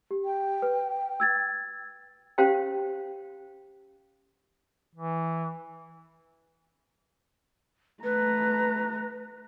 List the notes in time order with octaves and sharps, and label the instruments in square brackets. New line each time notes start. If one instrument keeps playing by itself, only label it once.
[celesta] G4
[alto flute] G5
[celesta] B4
E6 G#6 A6
[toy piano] C#4 G4 C5 F5 G5
[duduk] E3
[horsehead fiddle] A3 A#5 [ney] B4